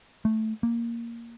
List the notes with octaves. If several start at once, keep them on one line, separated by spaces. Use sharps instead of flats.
A3
A#3